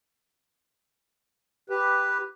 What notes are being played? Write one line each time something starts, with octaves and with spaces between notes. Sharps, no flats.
G4 B4